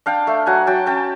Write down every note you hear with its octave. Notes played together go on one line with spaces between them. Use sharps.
D4 F5 G5
A3
F#3 F#5 G#5
F#3 G5 A5
C#4 G5 A5